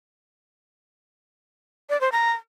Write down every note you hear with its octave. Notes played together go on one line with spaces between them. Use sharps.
D5
C5
A#5